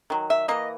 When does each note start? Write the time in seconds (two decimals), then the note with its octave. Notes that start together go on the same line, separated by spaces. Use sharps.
0.10 D#3 F#3
0.30 E5
0.48 E3 A#3 D#5